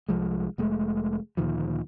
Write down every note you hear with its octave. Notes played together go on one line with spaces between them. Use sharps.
C2 F3 G#3
F1 G#3 A3
D2 A#2 D#3 F3